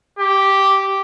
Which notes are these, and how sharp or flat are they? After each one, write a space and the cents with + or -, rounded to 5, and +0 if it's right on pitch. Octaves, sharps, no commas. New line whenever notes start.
G4 -5